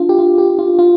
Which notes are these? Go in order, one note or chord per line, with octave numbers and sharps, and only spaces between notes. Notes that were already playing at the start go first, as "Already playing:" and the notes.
Already playing: D4 F4
G4
F4
G4
F4
F4